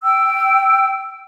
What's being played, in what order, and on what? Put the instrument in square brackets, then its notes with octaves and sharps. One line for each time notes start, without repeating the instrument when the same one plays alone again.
[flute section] G5 E6